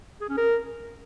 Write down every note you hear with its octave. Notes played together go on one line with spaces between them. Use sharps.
G#4
C#4
A#4